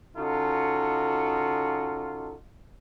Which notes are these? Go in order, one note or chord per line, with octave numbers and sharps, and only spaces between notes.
C#3 D#4 F4 F#4 A4